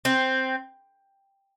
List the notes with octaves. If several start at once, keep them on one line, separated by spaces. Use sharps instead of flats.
C4